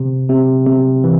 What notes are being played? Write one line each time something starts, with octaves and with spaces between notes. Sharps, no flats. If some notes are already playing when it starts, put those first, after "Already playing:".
Already playing: C3
C3
C3
E3